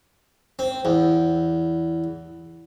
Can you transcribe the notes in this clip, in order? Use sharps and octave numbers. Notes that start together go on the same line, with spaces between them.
C4
E2